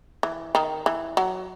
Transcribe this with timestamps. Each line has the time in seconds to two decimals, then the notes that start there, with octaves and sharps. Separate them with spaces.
0.23 E3
0.55 D#3
0.86 E3
1.17 F#3